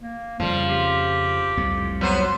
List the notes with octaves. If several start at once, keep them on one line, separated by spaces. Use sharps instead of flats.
A#3
F2 C#3 F3 G3
G4
C2 F2 A2
F#3 B3 C5